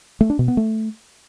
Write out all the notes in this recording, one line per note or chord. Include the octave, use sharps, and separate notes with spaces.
A3
D4
B2
B3
A3